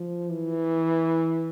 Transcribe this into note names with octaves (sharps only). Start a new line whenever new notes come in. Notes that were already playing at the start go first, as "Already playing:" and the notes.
Already playing: F3
E3